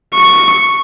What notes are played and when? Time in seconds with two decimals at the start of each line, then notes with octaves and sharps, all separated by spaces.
0.14 C#6